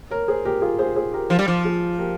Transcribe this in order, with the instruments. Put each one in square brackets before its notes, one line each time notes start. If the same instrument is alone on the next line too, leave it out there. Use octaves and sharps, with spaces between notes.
[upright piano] A#4 C#5
G#4 C5
G4 A#4
F4 G#4
G#4 C5
G#4 C5
G4 A#4
[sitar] F3
G3
F3
[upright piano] F4 G#4
G4 A#4